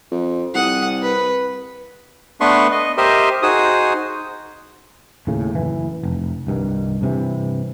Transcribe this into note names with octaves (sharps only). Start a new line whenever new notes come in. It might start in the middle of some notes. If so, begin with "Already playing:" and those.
F2
C2 F#5 D#6
B4
A3 B3 D4 B4 C6 C#6
D#5
G4 A#4 C5 D#5 E5
D#4 F#4 G#4 C5 D#6
D#2 A2 C#3
F#1 E3
F1
C2 G2 D#3
G2 C3 E3